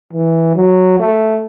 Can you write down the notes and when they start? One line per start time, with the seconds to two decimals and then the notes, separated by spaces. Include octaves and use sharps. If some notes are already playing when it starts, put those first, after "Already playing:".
0.13 E3
0.56 F#3
1.00 A3